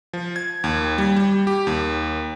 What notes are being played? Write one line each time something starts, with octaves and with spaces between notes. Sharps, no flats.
F3
G#6
D#2
G3
G3
G4
D#2